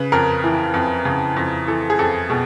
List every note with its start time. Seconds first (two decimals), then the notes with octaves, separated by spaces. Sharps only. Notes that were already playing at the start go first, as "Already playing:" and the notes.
Already playing: C#3 B4
0.12 F2 A#4
0.44 E3
0.74 F2
1.05 C#3
1.36 F2
1.67 E3 A4
1.90 G#4
1.99 F2 A4
2.30 B2 G#4